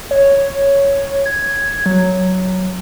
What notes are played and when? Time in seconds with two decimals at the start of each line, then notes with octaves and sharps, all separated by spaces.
0.11 C#5
1.26 G#6
1.86 F#3